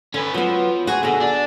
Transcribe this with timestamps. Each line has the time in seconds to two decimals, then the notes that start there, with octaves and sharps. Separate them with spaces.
0.14 D3 C#4 B4
0.34 F3 F#3 B3
0.87 F#4 G#4
1.03 B2 D3 G#4
1.20 D4